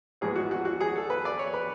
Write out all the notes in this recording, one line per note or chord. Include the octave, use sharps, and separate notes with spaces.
A1 G#2 G#3 B3 G#4
F#4
F#4
F#4
G#4
A4
B4
D5
C#5
B4